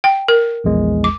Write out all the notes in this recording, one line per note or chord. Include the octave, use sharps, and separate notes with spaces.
G5
A#4
A#1 E2 G#3
D6